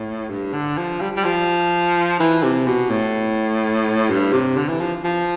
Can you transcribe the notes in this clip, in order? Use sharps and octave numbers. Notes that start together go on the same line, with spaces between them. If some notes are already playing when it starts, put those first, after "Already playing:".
Already playing: A2
G2
D3
F3
G3
G3
F3
E3
C3
B2
A2
G2
C3
D3
E3
F3
F3